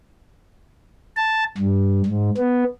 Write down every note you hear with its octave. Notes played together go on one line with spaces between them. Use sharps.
A5
G2
G#2
B3